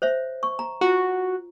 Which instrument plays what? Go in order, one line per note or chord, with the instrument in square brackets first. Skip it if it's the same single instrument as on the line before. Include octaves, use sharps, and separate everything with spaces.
[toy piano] C5 C#5 E5
C#6
A#5
[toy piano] F4 [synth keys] F#4